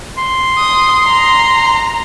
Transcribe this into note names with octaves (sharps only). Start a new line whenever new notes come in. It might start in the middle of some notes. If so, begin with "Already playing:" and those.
C6
D#6
A#5